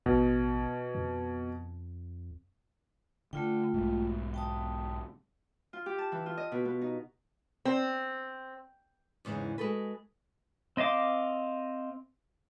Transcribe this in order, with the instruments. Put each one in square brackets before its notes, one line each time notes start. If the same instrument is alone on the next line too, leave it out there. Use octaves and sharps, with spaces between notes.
[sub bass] A1 [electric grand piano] B2
[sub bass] F2
[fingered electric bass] D3 [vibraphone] A3 F4 G5
[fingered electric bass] B1 G#2
[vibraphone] G5 A5 D#6
[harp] F4
G4
A5
E3
F4
D#5
B2
B3
D#4
[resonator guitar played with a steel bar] C4
[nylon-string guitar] E2 G#2 C#3 E3
G#3 F#4 A4 B4
[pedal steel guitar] C4 D#5 F5 D6